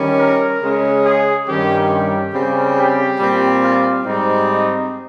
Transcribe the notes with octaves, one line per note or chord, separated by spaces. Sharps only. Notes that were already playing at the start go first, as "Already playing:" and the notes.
Already playing: D#3 G3 C#4
A#4
C#3 G#3 C#4
G#4
G2 D#3 G3 C#4 G4
G4
C#3 G3 C4
G4
A#2 G3 C4
F4
G#2 G3 C4 D#4
D#4